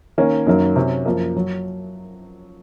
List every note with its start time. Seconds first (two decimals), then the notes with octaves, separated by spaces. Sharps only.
0.18 D#3 A#3 C#4
0.47 F#2 D#3 F#3 A#3
0.76 C3 F#3 C#4
1.06 F#2 F3 A#3
1.36 F#3